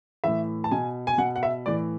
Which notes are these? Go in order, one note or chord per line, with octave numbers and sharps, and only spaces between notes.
A2 E3 E5
A5
B2 G#5
G#5
B2 F#5
F#5
E5
A2 E3 D5